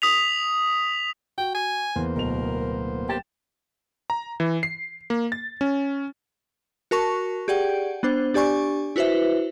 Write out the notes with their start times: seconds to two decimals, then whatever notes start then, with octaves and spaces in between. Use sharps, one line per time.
0.02 D#6 B6 F7
1.38 F#4 G5
1.54 G#5
1.96 E2 A#3 B3 C5
2.16 D1 B2 A#4 F7
3.09 G4 G5 A6 E7
4.10 A#5
4.40 E3
4.63 C7
5.10 A#3
5.32 A6
5.61 C#4
6.91 F#4 A#4 A5 C#6
7.48 G4 G#4 D5 F#5 G5
8.03 B3 D4 C5
8.34 D4 G4 D5 G#5 C#6
8.96 E4 F#4 B4 C5 E5